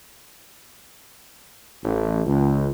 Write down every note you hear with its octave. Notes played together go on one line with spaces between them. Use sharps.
A1
C#2